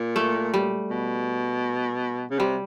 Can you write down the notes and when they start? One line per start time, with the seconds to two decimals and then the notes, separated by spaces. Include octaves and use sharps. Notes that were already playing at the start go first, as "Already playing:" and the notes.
Already playing: A#2
0.16 A3
0.54 G3
0.91 B2
2.31 C#3
2.39 C3 G3